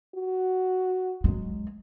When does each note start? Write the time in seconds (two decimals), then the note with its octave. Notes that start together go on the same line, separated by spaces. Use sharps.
0.15 F#4
1.24 F#3 G#3